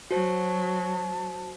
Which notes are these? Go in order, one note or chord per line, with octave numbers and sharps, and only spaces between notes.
F#3 F#4 C5 A5